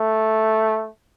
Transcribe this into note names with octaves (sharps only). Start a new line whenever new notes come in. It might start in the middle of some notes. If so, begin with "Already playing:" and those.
Already playing: A3